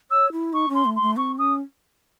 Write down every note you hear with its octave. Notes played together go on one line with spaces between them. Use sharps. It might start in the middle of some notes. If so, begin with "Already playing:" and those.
C#5 E6
E4
D#4 C#6
C#4
C6
A3
C6
A3
C4 C#6
C#4 D#6